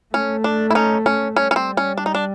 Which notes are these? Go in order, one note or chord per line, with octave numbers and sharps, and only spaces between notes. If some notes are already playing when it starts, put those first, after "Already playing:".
A3 C#4
D4
E4
C#4 D#4
C#4
G3 C#4
C#4
C4
C#4
D4
D#4
D4